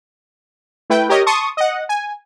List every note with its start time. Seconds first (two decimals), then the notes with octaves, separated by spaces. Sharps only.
0.90 A3 E4 B4 G5
1.09 G4 A#4 C#5 D#5
1.26 A5 C6 C#6 D#6
1.57 D#5 F#5
1.89 G#5